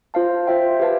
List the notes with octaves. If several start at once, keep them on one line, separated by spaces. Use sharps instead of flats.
F4 C5 F5 A5
F4 C5 E5 G5
G4 B4 F5 A5